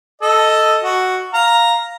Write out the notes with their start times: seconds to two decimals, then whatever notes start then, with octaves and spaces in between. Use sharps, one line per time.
0.22 A4 D#5
0.84 F#4
1.34 F5 A#5